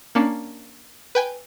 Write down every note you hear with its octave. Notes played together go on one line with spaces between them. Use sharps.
A#3 C#4 D4
B4 G5 G#5